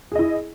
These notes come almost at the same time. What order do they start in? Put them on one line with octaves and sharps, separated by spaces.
G#4 D#5 E4